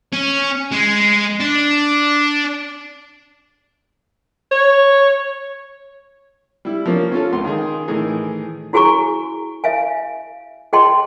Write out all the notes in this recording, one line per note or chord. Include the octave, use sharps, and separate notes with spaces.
C#4
G#3
D4
C#5
G3 E4
F3 A#3 C#4
C#4 F4 A4
C#2 C6
D#3 G#4
A2 D#3 E3 G#4
E4 F#4 G#4 G#5 A#5 C#6
E5 F5 G#5
G#4 D#5 G5 A5 C6